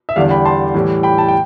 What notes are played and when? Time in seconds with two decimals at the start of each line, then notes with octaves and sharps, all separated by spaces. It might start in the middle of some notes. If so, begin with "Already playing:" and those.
0.09 E5
0.16 E2 D3 G3 D5 F5
0.31 G5 B5
0.45 A5 C6
0.74 A2 E3 G3
1.03 G5 B5
1.18 A5
1.28 G5